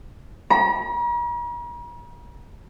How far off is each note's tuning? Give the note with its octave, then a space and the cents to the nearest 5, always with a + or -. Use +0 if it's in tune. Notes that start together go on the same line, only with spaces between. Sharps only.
A#5 +45